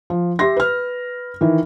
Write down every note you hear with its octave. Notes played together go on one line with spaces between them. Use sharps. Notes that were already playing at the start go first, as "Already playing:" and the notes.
F3
G4 E5 C6 A#6
B4 F6
D#3 E3